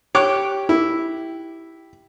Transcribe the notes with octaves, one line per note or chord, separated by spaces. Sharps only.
G4 C#5 D6 F#6
E4